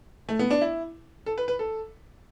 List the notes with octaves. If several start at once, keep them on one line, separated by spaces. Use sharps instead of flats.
A3
B3
D4
E4
A4
B4
B4
A4